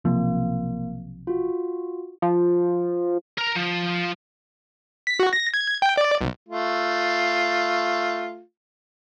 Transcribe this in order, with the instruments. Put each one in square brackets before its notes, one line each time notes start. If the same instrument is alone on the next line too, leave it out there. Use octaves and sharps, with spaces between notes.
[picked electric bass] B1 C3 F3 [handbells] A#3
[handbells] F4 F#4
[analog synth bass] F3
[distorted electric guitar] A#4 A#5
F3
[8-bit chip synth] B6
F#4
A#6
G#6
G5
D5
B1
[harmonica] A3 F4